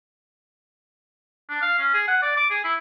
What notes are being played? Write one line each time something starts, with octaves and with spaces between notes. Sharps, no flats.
D4
F5
C#4
G#4
F#5
D5
D6
G#4
E4